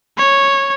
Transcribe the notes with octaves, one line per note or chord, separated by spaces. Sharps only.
C#5